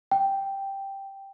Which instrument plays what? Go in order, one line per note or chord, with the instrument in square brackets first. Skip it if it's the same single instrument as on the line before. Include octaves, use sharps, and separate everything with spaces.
[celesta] G5